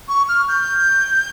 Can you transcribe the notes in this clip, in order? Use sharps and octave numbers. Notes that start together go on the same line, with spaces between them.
C#6
F6
G6